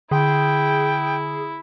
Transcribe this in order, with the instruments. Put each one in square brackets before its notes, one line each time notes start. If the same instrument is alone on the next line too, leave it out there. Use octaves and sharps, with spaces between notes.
[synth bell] D3 [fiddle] E4 [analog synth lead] G#4 [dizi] G5